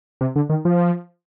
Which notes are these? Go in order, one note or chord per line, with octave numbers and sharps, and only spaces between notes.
C3
D3
D#3
F3